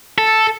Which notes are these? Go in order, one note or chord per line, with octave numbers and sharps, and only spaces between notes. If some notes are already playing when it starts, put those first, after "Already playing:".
A4